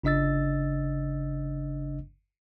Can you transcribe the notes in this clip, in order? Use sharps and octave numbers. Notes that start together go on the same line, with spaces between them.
G1 C#3 D4 D#5 E6 A6